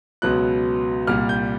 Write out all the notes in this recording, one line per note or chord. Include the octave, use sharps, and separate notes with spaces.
C#2 B2 F#3 B3 F#6
C2 A#2 G3 F6
G6